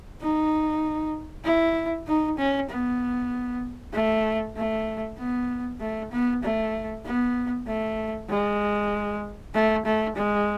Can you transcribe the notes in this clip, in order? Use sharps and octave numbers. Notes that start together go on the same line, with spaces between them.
D#4
E4
D#4
C#4
B3
A3
A3
B3
A3
B3
A3
B3
A3
G#3
A3
A3
G#3